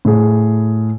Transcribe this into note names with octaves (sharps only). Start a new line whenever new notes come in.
A2 G#4